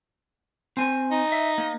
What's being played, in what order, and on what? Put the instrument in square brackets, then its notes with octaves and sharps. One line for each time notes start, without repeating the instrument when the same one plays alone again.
[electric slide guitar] C4 G#5
[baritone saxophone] D#4
[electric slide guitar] E5
A#3